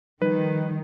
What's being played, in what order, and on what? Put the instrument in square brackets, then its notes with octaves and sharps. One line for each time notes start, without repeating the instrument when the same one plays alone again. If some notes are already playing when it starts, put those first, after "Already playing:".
[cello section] D#3 [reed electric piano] F3 G3 D#4 [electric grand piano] B4